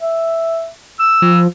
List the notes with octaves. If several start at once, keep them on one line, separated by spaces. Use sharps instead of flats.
E5
E6
F3